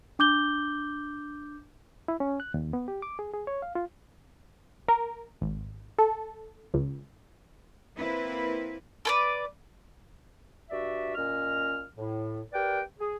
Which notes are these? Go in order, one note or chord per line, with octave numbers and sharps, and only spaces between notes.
D4 D6 G6 G7
E4
C#4
F#6
D#2
B3
G4
D6
G#4
G#4
C#5
F5
F4
A#4
G#1
A4
C#2
A#3 C4 E4 B4
A4 B4 D5
G2 F#4 D5 E5
A#2 C#4 D#5 F6
A2
G4 A#4 B4 D5 G5
G#4